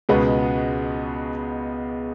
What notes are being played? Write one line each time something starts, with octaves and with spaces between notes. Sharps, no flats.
C#2 B2 G#3 B3 F#4